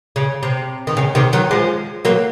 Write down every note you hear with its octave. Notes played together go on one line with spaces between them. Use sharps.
C#3
C3
D#3
C#3
C3 D#3
D#3 F#3
F3 G#3
F#3 A#3